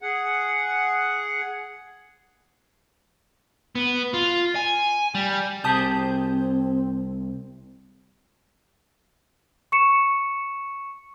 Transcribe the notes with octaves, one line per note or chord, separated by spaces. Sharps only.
G#4 F#5
B3
F4
G#5
G3
C2 C4 G4 G#4 A5 D#6 G6
C#6 C#7 E7